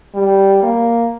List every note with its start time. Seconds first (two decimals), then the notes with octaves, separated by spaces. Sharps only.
0.14 G3
0.63 A#3